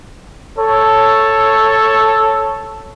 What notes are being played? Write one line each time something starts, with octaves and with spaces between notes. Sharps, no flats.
A4 C#5